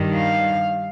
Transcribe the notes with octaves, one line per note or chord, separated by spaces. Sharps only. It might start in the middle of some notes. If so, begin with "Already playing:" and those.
Already playing: G2 D#3 G3
F5